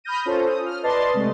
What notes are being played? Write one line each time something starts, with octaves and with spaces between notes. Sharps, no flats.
B5 D#6 F6 G6 A#6 D#7
C#4 F4 A4 C5
D#6
F6
B4 D5 D#5 A5 C6 A6
C3 G#3 A3